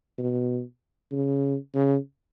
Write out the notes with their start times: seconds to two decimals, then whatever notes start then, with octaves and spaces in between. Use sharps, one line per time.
0.18 B2
1.12 C#3
1.74 C#3